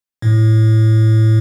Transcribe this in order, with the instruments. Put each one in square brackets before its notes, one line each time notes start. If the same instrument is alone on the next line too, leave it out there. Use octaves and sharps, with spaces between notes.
[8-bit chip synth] A2